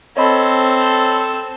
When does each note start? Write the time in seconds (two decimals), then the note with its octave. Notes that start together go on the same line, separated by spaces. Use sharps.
0.17 C4 A4 C#5 D#5 B5